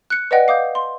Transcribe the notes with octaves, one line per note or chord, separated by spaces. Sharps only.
F#6 C#7
B4 D5 D#5 F#5 G5
F5 D6 D#6 G6
C6